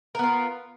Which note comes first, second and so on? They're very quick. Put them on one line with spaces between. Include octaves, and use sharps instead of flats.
A#4 B3 F4